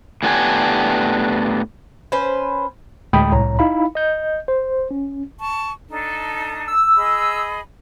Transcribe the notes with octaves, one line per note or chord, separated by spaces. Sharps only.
A2 G#3 B3 D4 G4 G#5
C#4 B4 C5
D2 A2 G#3 G5 B5 D#6
C2 A2 C#5 A#5
D#4 E4 F5 B5
D#5 G6
C5
C#4
A5 C#6
D4 D#4 A4
E6
G#4 D#5 B5